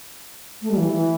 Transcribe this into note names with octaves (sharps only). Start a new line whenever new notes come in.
A3
G3
E3
E3